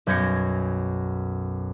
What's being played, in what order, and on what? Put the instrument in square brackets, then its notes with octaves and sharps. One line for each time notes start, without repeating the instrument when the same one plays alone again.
[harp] B1 F#2 G6 G#6 A#6 C#7